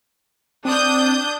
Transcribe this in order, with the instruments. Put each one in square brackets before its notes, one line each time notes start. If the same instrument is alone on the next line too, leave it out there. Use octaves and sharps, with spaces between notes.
[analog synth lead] C4 [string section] D4 D#6 G6